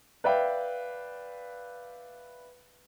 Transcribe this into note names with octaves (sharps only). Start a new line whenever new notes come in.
B4 D5 E5 F5 G5